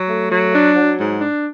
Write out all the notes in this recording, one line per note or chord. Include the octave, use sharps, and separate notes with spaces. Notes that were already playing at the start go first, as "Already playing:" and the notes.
Already playing: F#3
A3
F#3
D4
F#3
G#2
D4